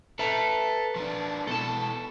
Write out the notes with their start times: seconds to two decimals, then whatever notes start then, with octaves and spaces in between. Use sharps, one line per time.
0.19 A4 B4 E5 A#5
0.96 F3 D4
1.47 B2 E4 A4 A5